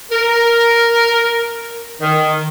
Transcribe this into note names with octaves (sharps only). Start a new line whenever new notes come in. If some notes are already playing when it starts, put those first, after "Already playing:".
A#4
D#3